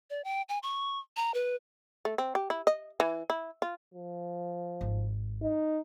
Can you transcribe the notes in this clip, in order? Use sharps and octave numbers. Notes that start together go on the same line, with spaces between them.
D5
G5
G#5
C#6
A#5
B4
A3
C4
G4
E4
D#5
E3
E4
F4
F3
G#1
D#4